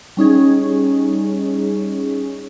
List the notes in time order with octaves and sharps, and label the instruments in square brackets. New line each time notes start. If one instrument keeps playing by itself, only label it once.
[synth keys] G3 C#4 D#4 G#4